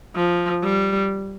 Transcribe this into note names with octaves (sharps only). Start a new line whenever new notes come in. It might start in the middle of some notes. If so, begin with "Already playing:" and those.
F3
G3